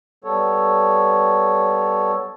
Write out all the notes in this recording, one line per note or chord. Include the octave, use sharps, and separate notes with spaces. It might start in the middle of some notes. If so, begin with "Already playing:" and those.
G3 B3 A4 C#5